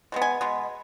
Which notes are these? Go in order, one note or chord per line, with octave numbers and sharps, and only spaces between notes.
B2 G#3 B3
G#5
B2 G#3 B3